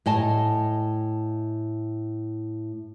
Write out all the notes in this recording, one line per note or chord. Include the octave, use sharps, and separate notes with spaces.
A2 D#5 G#5 A5